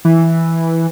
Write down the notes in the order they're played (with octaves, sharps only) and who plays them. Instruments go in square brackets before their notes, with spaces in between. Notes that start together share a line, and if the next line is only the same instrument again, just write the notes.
[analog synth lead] E3